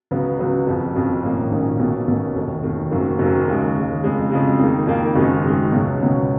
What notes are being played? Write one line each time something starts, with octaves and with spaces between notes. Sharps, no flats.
C#2 C#3 F#3 B3
C#2 C#3 F#3 B3
F#1 F2 F3
F#1 F2 F3
A#1 G#2 D#3 A#3 C#4
A#1 G#2 D#3 A#3 C#4
B1 B2 A#3 C#4
B1 B2 A#3 C#4
F1 D#2 D#3
F1 D#2 D#3
F#1 F#2 D#3 F#3 A#3
F#1 F#2 D#3 F#3 A#3
D#2 C#3 G#3
D#2 C#3 G#3
F2 C#3 G#3
F2 C#3 G#3
F2 D#3 A#3 D#4
F2 D#3 A#3 D#4
F#1 F#2 D#3 G#3 D#4
F#1 F#2 D#3 G#3 D#4
C#2 B2 F#3 C#4
C#2 B2 F#3 C#4